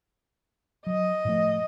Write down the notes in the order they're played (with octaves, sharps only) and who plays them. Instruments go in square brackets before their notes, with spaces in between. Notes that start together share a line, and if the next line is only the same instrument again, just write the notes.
[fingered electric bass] F#3 [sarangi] D#5
[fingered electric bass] A2 F3 A3